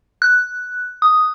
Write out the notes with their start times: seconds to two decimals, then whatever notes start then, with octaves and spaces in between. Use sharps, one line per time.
0.22 F#6
1.02 D#6